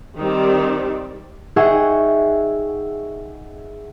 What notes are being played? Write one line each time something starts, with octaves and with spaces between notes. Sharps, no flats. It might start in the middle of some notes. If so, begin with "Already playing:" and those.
D#3 G3 C4 D5
D#4 G#4 E5 F#5 G5 C#6